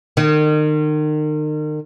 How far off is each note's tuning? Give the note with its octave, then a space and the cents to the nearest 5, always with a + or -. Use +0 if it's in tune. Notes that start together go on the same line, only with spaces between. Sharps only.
D#3 -35